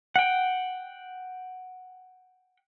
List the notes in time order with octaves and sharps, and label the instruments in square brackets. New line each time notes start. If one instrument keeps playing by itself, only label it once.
[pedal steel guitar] F#5 G5